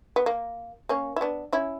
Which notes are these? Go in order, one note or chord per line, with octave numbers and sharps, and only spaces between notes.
B3
A#3
A#3 C#4
E4
B3 D4
C#4 E4